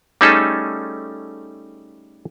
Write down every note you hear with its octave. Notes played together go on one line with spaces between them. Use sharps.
G3 A3 C#4 D#4 G#4 A4